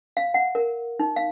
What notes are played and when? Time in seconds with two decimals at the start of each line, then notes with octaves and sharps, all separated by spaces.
0.17 F5
0.34 F#5
0.55 A#4
0.99 D#4
1.16 F5